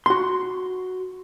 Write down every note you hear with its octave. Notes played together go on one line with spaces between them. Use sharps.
F#4 C6